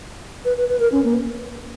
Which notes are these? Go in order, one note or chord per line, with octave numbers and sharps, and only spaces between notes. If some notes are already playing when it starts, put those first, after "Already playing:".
B4
B4
B4
A#4
C#4
A#3